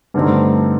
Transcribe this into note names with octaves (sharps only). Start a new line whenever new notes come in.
G2 D3 A3 C4 D#4